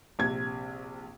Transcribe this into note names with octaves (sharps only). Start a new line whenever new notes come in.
A#1 C3 G#6